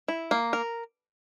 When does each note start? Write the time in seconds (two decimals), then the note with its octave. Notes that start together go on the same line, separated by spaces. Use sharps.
0.08 E4
0.31 A#3
0.53 A#4